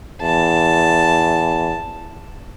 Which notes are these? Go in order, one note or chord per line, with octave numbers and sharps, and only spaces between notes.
E2 A5